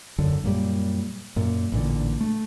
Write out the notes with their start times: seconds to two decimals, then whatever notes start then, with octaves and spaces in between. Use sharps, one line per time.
0.19 E1 F#2 D3
0.44 F#2 A#2 G3
1.36 F#2 A#2
1.72 A1 A#2 D3
2.21 A3